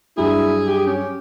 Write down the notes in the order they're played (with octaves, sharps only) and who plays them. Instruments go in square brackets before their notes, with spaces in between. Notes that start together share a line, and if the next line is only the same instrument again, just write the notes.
[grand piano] G2 F#3 [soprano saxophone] E4 [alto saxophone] G#4
[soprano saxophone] G4
[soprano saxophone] C#4 [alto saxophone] G4